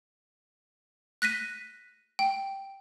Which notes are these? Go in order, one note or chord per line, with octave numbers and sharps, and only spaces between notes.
F#6 A#6 B6 D#7
G5